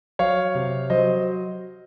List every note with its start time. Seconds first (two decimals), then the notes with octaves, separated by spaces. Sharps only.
0.19 F#3 C#5 F5
0.55 C3
0.90 F#3 C5 D#5